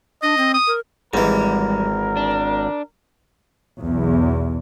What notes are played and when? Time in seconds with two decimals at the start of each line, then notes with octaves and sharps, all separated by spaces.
0.23 D4 D#5
0.38 C4
0.54 D#6
0.67 A#4
1.14 G#1 G#2 E3 G3 A#4
2.17 D4
3.82 B1 E2